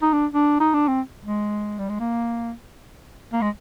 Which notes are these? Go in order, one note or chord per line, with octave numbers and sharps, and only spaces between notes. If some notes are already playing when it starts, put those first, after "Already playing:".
D#4
D4
D4
D#4
D4
C4
G#3
G3
G#3
A#3
A#3
G#3